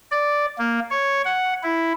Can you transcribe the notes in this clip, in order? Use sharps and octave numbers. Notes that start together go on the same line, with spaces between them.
D5
A#3
C#5
F#5
E4